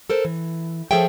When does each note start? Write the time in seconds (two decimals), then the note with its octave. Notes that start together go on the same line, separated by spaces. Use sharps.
0.10 A4 A#4 C5
0.25 E3
0.91 F3 G#4 A4 C#5 E5 G5